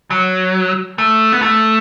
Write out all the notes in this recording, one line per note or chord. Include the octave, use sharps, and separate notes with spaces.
F#3
A3
B3
A3